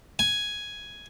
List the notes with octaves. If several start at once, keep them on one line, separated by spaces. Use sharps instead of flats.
G#5